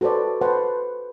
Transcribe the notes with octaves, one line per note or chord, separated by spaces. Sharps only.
F#4 A4 B4 C5 D5
B4 C5 F#5 A5